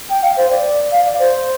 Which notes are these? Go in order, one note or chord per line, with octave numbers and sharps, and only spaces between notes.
G5
F5
C5
D5
F5
D5
C5